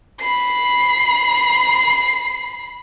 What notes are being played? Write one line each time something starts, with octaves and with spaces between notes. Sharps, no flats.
B5 C7